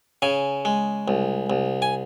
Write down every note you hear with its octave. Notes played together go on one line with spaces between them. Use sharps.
C#3 G#5
G#3
C2
C2
G#5